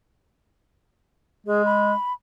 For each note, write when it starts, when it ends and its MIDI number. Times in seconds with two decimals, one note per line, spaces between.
1.47 1.93 56
1.47 1.62 68
1.66 2.13 83